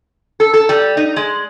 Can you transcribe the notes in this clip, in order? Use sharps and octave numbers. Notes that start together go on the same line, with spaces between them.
A4
A4
G3
D#4
G#3